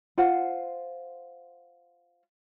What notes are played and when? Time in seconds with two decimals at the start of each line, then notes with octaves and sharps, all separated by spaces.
0.18 F4 C5 F#5